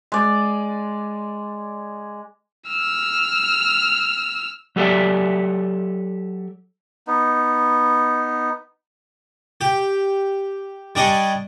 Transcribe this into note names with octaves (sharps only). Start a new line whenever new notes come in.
G#3 D5
E6 F6
F#3 G4 A4 D5 E5
B3 D#4
G4
G3 D4 D#5 G#5 C#6